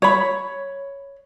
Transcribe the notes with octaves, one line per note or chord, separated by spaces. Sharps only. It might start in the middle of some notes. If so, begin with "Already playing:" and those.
C#5 B5